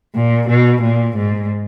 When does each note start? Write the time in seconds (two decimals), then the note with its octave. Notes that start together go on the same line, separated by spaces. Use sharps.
0.15 A#2
0.49 B2
0.82 A#2
1.16 G#2